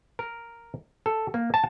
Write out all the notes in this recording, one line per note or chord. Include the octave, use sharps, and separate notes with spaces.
A#4
A4
A#3
A5